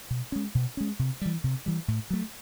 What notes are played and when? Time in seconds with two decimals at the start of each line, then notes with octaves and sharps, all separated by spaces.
0.10 B2
0.32 G#3 C#4
0.55 B2
0.77 G#3 C#4
0.99 C3
1.21 E3 G3
1.44 C3
1.66 E3 G3
1.88 A2
2.10 F#3 A3